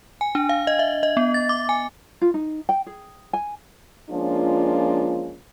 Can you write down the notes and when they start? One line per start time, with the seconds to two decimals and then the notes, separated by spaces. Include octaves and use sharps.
0.21 G#5
0.35 D4
0.49 F5
0.67 D#5
0.79 E5
1.03 D#5
1.17 B3
1.34 A6
1.49 D6
1.69 G#5
2.21 F4
2.34 D#4
2.69 G5
2.87 G#4
3.33 G#5
4.10 F3 G#3 A#3 C#4 D4 F4